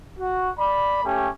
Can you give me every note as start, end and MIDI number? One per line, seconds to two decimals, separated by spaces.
0.19 0.50 66
0.58 1.02 74
0.58 1.02 83
1.04 1.28 57
1.04 1.28 61
1.04 1.28 67